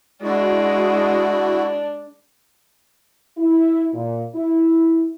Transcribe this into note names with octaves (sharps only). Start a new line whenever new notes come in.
G#3 D4 E4 F#4
E4
A#2
E4